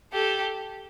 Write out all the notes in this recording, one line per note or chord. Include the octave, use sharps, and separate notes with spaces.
G4 A4